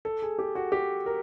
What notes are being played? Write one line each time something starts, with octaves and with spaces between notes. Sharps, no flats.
A4
G#4
G4
F#4
G4
A#4